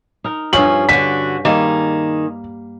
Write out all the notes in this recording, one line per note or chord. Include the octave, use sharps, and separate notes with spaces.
D#4 A#4
G2 F3 C#4 G#4 F#7
D3 F#4 B6
D#3 G3 A#3 G#4